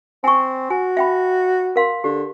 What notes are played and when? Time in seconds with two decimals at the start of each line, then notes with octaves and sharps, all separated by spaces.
0.24 C4 G#5 C#6
0.70 F#4 G#5
0.97 E5 G5 B5
1.76 A#4 F5 C6
2.04 D3 G4